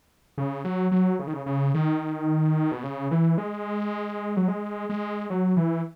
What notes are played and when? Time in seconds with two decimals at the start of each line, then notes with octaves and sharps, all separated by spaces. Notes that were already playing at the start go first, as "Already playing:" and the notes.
0.38 C#3
0.65 F#3
0.92 F#3
1.19 C#3
1.27 D#3
1.33 C#3
1.46 C#3
1.74 D#3
2.72 B2
2.83 C#3
3.11 E3
3.38 G#3
4.37 F#3
4.48 G#3
4.89 G#3
5.30 F#3
5.57 E3